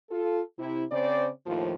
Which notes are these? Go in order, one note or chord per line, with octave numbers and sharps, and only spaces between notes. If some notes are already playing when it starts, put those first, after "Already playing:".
F4 A4
C3 E4
C#3 C4 C5 D5
D#2 A2 F3